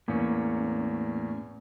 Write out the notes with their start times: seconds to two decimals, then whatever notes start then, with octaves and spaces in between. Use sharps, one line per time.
0.08 E2 A2 A#3 C#4